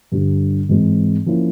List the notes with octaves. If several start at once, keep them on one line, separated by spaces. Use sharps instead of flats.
G2 D3 G3
G#2 E3 G#3 C4
F3 A#3 C#4 E4